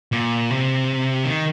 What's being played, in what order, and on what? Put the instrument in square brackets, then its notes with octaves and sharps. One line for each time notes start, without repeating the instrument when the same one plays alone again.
[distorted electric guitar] A#2
C3
D#3